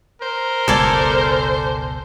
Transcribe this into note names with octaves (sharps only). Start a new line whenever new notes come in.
A#4 C5
F#1 C#2 B2 A4 D5 G#5